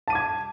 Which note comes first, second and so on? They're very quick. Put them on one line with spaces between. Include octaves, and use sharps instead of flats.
A5 D#7 D6 G#6